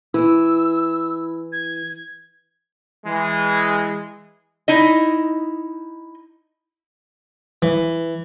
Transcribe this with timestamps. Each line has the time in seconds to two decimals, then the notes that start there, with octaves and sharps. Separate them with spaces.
0.14 E3 E4 E6
1.52 G#6
3.06 E3 G#3
4.68 D#4 E4 D#5
7.62 E3